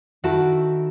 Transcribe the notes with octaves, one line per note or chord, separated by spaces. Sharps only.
D#3 E4 F#4 A4